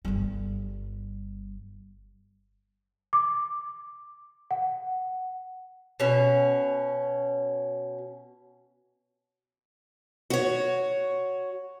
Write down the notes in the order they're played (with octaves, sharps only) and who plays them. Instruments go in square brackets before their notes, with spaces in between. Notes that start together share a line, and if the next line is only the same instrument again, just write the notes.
[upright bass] G1 G3
[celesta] D6
F#5
[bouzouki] B2 C#4
[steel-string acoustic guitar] F#4 C#5